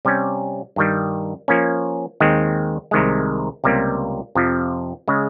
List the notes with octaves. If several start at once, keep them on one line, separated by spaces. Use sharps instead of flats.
C3 G3 C#4
G2 D#3 G3
F3 A#3 C#4
D#2 D#3 G#3 C4
C2 C3 D#3 G#3
C#2 C3 G3 A#3
F2 C3 F3
C#3 G#3